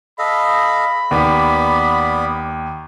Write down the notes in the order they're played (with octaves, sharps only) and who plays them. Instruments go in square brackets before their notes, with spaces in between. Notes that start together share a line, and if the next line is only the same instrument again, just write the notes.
[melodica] A4 D#5 F5 [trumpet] B5
[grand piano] D#2 [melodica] B3 D5